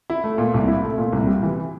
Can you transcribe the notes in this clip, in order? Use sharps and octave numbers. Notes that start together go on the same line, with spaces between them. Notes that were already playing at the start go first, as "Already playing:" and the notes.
E4
A3
A#2
C2
E4
A3
A#2
C2
G3
E3